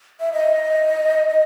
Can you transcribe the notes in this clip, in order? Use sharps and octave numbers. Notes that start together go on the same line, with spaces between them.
E5
D#5
D#5